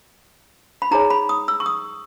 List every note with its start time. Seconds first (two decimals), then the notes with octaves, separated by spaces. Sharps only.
0.82 B5
0.91 D#4 G#4 C#5 A#5
1.10 B5
1.29 D#6
1.48 E6
1.60 C#6
1.66 D#6